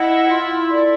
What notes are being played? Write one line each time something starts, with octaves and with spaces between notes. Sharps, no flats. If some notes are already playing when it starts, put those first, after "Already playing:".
Already playing: E4 D#5 F#5
F4
A4 D5